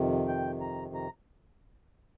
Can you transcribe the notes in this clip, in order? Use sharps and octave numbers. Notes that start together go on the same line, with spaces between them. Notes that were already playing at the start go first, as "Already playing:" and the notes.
Already playing: F2 C3 D#3
G5
A#5
A#5